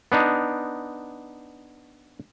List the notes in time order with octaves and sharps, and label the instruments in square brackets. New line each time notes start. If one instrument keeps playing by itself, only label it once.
[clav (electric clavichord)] B3 D4 D#4